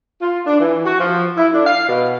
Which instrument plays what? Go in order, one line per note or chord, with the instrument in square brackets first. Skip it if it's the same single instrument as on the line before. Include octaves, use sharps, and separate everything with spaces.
[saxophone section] F4
D4
E3
F#4
F3
E4
D4
F5
B2